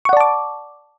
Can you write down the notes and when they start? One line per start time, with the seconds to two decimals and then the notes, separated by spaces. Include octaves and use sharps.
0.05 C#6
0.09 F#5
0.13 D5
0.17 A5
0.21 D6